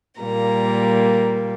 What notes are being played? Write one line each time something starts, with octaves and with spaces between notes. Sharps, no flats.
A#2 G3 A#3 A#5